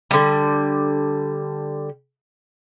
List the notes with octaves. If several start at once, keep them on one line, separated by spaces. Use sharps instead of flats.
D3 G3